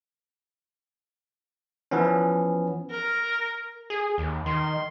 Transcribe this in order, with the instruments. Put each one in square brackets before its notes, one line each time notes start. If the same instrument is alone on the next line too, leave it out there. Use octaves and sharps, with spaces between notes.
[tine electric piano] E3 F3 B3 C#4
[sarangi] A#4
[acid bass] G#4
D#2
[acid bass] D#3 [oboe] C6